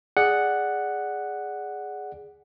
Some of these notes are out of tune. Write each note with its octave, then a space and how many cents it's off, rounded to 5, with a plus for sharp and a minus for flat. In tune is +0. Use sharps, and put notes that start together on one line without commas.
G#4 +0 D5 +5 F#5 +0